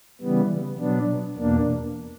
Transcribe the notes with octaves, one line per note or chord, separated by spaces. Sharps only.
C#3 E3 G3 B3
B2 F#3 B3 D4
E2 B2 A#3 D4